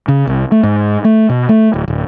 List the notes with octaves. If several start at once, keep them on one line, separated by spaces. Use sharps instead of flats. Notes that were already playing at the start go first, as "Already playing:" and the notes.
C#3
C2
A3
G#2
A3
B2
A3
D1
D1